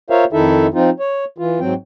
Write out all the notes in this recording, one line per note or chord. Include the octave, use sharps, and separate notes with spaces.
F4 A#4 C5 C#5 E5 F5
F2 D#3 D#4 E4 A4 E5
F3 C4 D#4 F4
C#5
E3 F4
G#2 F#3 C4 G5